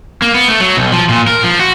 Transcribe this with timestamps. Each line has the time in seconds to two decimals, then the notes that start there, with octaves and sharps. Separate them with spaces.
0.22 A#3
0.35 B3
0.48 A3
0.60 F#3
0.77 B1
0.92 F3
1.09 A#2
1.28 A#4
1.44 F3
1.59 F#4